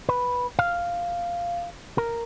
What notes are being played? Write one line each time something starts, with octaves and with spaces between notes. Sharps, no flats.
B4
F5
A#4